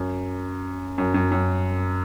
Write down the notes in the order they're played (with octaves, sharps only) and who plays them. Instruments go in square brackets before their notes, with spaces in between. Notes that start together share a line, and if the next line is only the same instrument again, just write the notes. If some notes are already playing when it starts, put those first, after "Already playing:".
Already playing: [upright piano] F#2
F#2
F#2
F#2